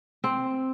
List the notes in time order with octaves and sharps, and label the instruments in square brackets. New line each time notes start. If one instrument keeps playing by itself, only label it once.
[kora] C4